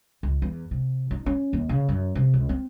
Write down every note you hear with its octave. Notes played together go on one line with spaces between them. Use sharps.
C#2
E2
C3
D#4
C#4
D#2
C#3
F#2
C3
C#2
C4